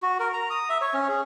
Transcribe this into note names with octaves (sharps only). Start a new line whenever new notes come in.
F#4
A#4
A#5
D#6
E5
C#5
C#4
G#4